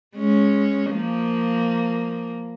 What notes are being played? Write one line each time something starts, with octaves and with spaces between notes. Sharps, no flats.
G#3 C#4
F3 A#3